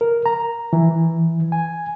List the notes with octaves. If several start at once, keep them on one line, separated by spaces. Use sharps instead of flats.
A#4
A#5
E3
G#5